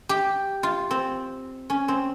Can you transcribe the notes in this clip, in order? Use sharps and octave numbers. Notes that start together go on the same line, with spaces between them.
G4
F4
C4
C#4
C4